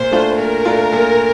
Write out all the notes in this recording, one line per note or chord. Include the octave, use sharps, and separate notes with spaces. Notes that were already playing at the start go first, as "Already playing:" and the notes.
Already playing: A#2 C5
A3 D4 F4
A#2 A#4
A3 D4 F4
A#2